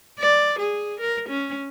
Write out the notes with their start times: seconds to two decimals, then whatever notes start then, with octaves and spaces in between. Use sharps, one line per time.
0.19 D5
0.60 G#4
1.00 A#4
1.29 C#4